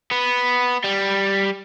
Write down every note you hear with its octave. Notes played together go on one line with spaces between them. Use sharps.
B3
G3